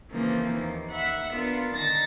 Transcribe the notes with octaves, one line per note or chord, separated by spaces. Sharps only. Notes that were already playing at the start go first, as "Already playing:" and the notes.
C#3 E3 F3 A#3 C4 D#4
D#2
E5 F#5 B5
B3 D4 F4 A#4
D3 D#3 A5 A6 A#6